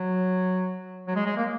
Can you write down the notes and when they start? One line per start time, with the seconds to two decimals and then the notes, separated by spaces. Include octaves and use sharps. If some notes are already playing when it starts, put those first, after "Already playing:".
Already playing: F#3
1.07 F#3
1.15 G#3
1.25 G#3
1.37 A#3